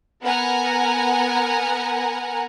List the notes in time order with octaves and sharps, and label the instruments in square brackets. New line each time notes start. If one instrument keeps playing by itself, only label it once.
[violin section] B3 A#4 F#5 G#5 A#5